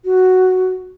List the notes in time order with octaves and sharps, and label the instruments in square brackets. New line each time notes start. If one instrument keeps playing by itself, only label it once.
[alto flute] F#4